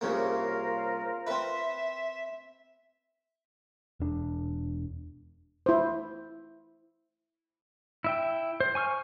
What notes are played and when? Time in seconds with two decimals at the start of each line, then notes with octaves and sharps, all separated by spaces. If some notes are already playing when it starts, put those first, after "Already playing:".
0.01 C2 C#3 A#3 F4 A#4 C5
1.27 C4 B4 E5
4.00 E1 D4
5.66 E4 C5
8.04 E4 E5 G5
8.60 C5
8.75 G#5 C#6 E6 F6